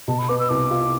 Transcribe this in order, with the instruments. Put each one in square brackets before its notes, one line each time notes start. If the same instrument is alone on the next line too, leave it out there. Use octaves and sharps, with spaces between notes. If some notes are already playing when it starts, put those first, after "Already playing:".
[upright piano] B2 [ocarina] A5
[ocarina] B5
[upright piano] B3 [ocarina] D6
[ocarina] E6
[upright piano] C2 [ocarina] D6
[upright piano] F4